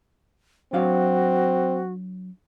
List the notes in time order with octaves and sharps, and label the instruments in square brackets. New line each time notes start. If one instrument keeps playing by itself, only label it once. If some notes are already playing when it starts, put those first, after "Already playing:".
[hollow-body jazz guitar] F#3 D4 F5 [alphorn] C4 [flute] F#4